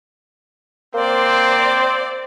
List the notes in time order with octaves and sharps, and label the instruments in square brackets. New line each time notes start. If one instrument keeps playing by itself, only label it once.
[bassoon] A#3 [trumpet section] C4 [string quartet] C5 D5